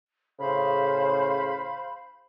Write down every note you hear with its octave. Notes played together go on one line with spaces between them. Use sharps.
A2 C#3 C5 F5 B5